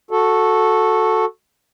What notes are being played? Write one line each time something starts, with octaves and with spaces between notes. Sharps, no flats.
F#4 A4